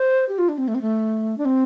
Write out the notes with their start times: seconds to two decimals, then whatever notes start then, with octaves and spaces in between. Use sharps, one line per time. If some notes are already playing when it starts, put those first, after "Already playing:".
Already playing: C5
0.29 G4
0.38 F4
0.49 D4
0.58 C4
0.68 A3
0.75 C4
0.82 A3
1.38 D4
1.45 C4